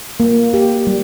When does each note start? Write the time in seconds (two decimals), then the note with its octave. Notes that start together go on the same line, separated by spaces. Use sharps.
0.20 A#3
0.54 G4
0.87 G3